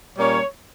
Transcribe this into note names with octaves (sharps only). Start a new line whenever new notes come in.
A#2 G3 A#3 C#4 C#5